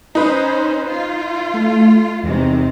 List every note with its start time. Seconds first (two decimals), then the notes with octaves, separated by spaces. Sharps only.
0.15 C#4 D#4 B4 C5
0.91 F4
1.54 A3
2.24 E2 C3 D#3 G#3